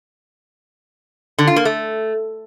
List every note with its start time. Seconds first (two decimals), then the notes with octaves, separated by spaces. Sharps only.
1.38 D3
1.47 F4
1.56 A#3
1.65 A3